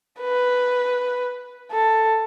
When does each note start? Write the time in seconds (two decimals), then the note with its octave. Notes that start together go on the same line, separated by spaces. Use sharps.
0.20 B4
1.71 A4